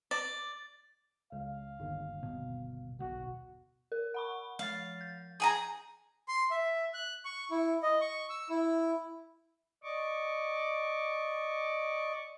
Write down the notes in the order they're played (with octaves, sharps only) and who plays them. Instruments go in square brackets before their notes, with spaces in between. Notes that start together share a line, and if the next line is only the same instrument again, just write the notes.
[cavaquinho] D5
[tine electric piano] C#2 [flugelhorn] F5
[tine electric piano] G1 D#2
[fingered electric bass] B2
[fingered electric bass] B1 [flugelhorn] F#4
[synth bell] A#4
F#5 B5 C#6
[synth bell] F3 A6 [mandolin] F5
[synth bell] G6
[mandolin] G#4 G#5 A#5
[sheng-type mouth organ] C6
E5
F#6
C#6
E4
D#5
C#6
E6
E4
[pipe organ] D5 D#5 C#6 D6